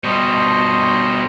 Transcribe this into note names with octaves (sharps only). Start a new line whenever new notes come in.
B2 G3 C5 D#5